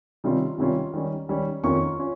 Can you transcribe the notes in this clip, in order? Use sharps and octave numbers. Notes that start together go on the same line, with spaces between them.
C3 D#3 G3 C#4 F4
C3 D#3 G3 C#4 F4
D#3 G3 C#4
D#3 G3 C#4
F2 D#3 A#3 C#4 F4 C#6
C#4 F4